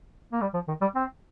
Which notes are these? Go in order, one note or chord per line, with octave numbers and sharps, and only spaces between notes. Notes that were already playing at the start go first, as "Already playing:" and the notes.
A#3
G3
F3
D#3
G3
C4